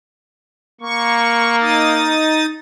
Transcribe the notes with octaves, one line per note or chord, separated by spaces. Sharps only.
A#3 C#6
D#4 D#6 A6